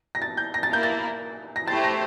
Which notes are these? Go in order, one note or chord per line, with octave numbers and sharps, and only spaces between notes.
A#6
A6
G6
A#6
A6
A#3 E4 A#4 G6
A6
A#6
A3 E4 G4 C5 A6
A#6